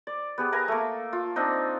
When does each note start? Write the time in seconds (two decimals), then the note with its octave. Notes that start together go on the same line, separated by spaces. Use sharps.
0.07 D5
0.38 B3 G4 G#4
0.52 A#4 B4 G#5 A#5
0.68 A3 A#3
1.13 F4
1.36 C4 D4 D#4